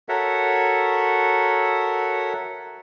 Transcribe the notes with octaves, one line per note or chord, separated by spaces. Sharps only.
F#4 A4 A#4 C#5 E5 F#5